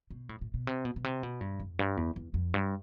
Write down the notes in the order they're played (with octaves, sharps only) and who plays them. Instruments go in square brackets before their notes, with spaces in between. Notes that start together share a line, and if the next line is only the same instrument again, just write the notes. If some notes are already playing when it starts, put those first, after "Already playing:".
[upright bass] B2
A2
A2
B2
C3
B2
B2
C3
B2
G2
F2
G2
E2
E2
F2
G2